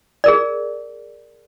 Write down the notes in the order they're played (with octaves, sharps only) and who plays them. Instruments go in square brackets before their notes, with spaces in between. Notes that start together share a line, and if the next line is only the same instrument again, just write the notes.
[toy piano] G#4 A#4 D5